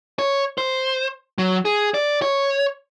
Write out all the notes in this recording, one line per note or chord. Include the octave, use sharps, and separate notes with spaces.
C#5
C5
F#3
G#4
D5
C#5